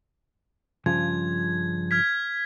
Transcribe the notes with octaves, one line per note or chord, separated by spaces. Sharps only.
G2 C#3 F3 G#6
F6 G#6 B6